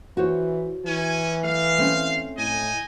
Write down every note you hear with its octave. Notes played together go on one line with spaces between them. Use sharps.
E3 F#4 C5 C#5
E3 C#4 G#5
A3 F5
A3 C4 C#4
A2 D#4 D#5 G#5